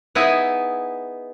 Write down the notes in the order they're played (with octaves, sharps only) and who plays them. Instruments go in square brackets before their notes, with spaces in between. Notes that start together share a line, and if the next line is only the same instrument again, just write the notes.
[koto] B3 D#4 E4 G#4 E5 G#5